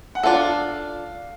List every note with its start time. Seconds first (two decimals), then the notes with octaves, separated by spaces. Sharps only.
0.15 F#5
0.23 D4 F4 A4 F5